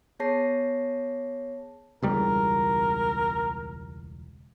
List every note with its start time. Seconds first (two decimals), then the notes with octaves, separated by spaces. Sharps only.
0.19 B3 G#4 C#5 A5 A#6 C7
2.02 E1 C#2 G3 A#4